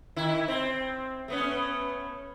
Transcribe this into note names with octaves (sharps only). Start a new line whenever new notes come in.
D#3 E4
C4
A3 B3 C#4